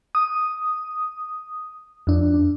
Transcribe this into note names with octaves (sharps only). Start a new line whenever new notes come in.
D#6
F2 D4